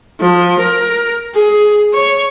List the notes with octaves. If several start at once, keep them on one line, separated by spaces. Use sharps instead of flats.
F3
A#4
G#4
C#5